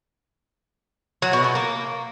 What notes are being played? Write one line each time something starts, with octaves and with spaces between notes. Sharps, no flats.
F#3
B2
B2
A#3